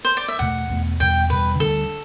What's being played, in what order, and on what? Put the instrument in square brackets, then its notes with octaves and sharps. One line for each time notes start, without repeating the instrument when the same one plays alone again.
[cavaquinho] C5
D5
E5
[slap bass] E2 B2 A3 [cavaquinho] F#5
[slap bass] E2 B2 A3
[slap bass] E2 B2 G3 [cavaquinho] G5
[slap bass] E2 B2 G3 [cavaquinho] B4
[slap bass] D2 D3 G3 D4 [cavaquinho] A4